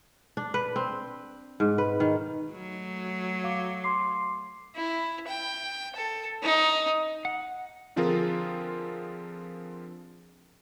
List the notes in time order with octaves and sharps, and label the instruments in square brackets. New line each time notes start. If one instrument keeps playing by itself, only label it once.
[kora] D4
B4
C4
G#2
B4
D#3
[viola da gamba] F#3 A3
[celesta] F5 D6
C6 D6 C7
[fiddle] E4
G5
A4
D#4
[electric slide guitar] F#5
[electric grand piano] D3 F3 C4 F4 G#4 A#4